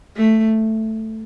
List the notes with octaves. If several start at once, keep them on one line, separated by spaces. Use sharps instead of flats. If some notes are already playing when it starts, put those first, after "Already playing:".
A3